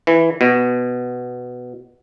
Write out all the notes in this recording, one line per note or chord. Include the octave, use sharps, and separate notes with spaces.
E3
B2